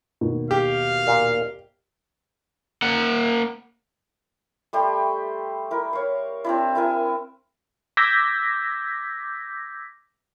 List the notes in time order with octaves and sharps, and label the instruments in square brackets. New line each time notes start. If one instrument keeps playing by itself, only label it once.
[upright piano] D#2 B2
[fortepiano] G4 [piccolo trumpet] F5
[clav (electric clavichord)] A#2
[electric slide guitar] A#3 F#5
[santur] G3 A3 G4 C6
E4 A#4
C#5 F5
C4 D4 E4
E4 A#4 G#5
[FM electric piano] D6 E6 G6 G#6 A#6 B6